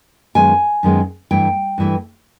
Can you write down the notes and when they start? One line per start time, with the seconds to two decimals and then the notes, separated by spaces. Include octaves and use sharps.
0.35 F#2 D#3 G#3 B3 G#5
0.83 F#2 D#3 G#3 B3
1.31 G2 E3 A3 G5
1.78 G2 E3 A3